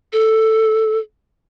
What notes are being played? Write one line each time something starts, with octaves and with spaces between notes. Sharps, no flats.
A4